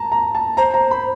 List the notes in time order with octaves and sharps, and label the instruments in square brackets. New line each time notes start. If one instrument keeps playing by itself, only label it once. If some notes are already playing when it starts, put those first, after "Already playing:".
Already playing: [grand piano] A5 A#5
A#5
A5
[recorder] C5 [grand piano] A#5
[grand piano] A#5
B5